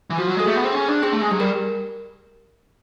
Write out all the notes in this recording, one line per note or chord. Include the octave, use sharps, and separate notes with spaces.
E3
F3 F#4
F#3
G#3 A4
A3 G#4
B3
C4
C#4
D4
C4 G#4
A3
G#3
F#3 G4
G3 A#4